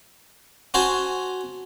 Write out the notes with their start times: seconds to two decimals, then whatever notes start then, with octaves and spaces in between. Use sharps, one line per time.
0.74 C#4 F#4 C5 G#5 A5